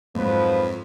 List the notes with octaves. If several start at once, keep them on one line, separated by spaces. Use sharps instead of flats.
F2 G#2 D#3 F3 F#3 B4